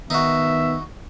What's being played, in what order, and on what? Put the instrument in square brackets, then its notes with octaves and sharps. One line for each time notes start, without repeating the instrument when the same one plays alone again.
[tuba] D#3 [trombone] B3 [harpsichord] D#4 F#4 [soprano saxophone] E5